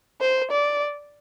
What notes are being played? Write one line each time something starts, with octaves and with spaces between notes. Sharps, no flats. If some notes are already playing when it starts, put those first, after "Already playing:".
C5
D5